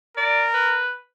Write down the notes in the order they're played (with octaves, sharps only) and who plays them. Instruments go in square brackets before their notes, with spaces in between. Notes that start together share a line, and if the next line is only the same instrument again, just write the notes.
[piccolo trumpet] A#4 [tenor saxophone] D5
[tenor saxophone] B4